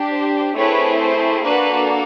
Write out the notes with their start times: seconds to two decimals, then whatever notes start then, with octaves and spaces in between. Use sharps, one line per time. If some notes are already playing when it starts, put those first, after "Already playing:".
Already playing: D4 G4
0.12 C5
0.56 A3 C4 E4 G#4 B4 C#5
1.00 C5
1.45 A#3 D4 F#4 A4 B4